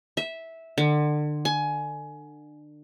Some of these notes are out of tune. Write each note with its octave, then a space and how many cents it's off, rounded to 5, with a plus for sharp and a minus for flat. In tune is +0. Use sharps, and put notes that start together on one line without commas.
E5 -10
D3 +30
G#5 +20